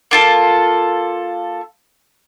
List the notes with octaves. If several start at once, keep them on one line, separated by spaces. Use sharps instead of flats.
A#3 F4 A4